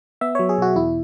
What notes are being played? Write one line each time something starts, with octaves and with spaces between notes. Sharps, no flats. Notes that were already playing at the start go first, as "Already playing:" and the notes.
B3 E5
F#3 C#5
G#4
B2 F#4
E2 E4